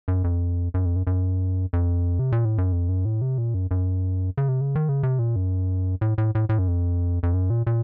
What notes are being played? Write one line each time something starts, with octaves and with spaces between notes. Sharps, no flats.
F#2
F2
F#2
F2
F#2
F#2
F2
C3
A#2
A2
F#2
F2
F#2
A2
C3
A#2
F#2
F#2
C#3
C3
C#3
D#3
C#3
C3
A#2
F#2
A2
A2
A2
A2
F#2
F2
F2
F#2
A#2
A#2